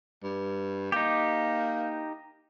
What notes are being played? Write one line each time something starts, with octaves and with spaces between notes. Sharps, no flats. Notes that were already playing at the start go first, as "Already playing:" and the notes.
G2
A#3 D#4 G4